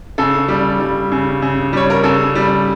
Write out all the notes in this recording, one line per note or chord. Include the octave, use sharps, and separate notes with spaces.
C#3 A4
G3
G3
C#3
C#3
G3 C#5
A#4
C#3 A4
G3